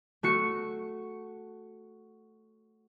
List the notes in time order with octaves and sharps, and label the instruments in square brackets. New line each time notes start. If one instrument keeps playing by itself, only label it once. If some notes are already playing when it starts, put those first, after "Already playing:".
[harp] A3 F#4 C#7